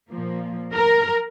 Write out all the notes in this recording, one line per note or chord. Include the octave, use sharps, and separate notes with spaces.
A#2 F3 A#3
A#4